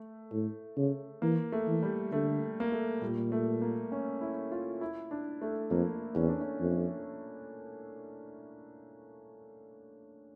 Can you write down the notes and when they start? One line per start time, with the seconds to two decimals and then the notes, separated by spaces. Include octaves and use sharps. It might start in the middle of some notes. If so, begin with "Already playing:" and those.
Already playing: A3
0.32 A2
0.77 C#3
1.22 E3 A#3
1.52 A3
1.68 E3
1.83 G3
2.12 D3 A3
2.60 A#3
2.72 A3
3.02 A#2 G3
3.32 A3
3.62 A#3
3.92 C#4
4.21 E4
4.52 F4
4.81 E4
5.11 D4
5.42 A3
5.70 F2 A#3
6.15 E2 C#4
6.28 D4
6.41 C#4
6.60 F2